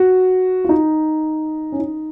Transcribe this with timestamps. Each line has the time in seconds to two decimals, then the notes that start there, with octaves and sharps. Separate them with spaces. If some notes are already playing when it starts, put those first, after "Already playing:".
Already playing: F#4
0.64 F4
0.69 D#4
1.72 C#4
1.79 D#4